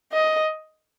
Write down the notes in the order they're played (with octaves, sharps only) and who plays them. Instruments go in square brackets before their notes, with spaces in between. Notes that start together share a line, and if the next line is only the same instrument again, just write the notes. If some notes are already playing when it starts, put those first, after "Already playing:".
[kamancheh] D#5